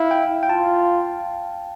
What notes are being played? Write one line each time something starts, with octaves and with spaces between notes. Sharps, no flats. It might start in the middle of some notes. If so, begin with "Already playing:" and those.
Already playing: E4 F5
G5
G5
F4 A5